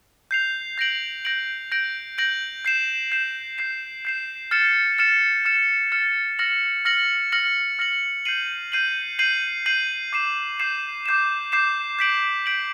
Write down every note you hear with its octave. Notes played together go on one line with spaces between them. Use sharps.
G6 C7 F7
G6 A#6 D7 F#7
G6 A#6 D7 F#7
G6 A#6 D7 F#7
G6 A#6 D7 F#7
G6 C7 E7
G6 C7 E7
G6 C7 E7
G6 C7 E7
F6 A6 C#7 E7
F6 A6 C#7 E7
F6 A6 C#7 E7
F6 A6 C#7 E7
F6 A#6 C#7 F#7
F6 A#6 C#7 F#7
F6 A#6 C#7 F#7
F6 A#6 C#7 F#7
G6 C7 D#7 F#7
G6 C7 D#7 F#7
G6 C7 D#7 F#7
G6 C7 D#7 F#7
D6 G6 C7 E7
D6 G6 C7 E7
D6 G6 C7 E7
D6 G6 C7 E7
G6 B6 D7 F#7
G6 B6 D7 F#7